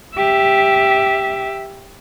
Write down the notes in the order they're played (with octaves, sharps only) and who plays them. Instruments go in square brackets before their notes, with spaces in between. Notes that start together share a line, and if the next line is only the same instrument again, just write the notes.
[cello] G4 E5